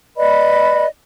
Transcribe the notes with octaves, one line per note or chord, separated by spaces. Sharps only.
B4 D5 D#5 B5